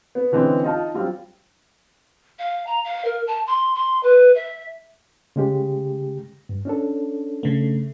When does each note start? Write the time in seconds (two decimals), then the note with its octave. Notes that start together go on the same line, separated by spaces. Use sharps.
0.15 B3
0.32 D3 E3 G#3 C4 C#4
0.64 D#4 F4 A5
0.94 F#3 G3 C4 F4
2.39 F5
2.67 A#5
2.85 F5
3.05 A#4
3.27 A5
3.47 C6
3.75 C6
4.03 B4
4.35 E5
5.36 C#3 G#3 G4
6.49 G2
6.65 C#4 D4 A4
7.43 C#3 A3